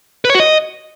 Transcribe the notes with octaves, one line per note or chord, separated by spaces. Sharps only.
B4
C#5
F#4
D#5